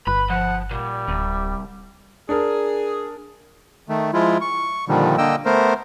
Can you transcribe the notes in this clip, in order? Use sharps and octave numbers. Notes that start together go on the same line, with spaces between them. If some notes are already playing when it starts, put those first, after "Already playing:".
G1 B4 B5
F3 F#5
A#2 G3
D1 C2
D4 G#4 A#4
D#3 A3
F3 G#3 E4 F4
C#6
A#2 D3 D#3 F3 G3
D3 A#3 D#5 G5 E6
A3 B3 A#4 C5